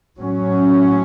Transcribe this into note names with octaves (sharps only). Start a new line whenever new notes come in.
A2 F#3 C#4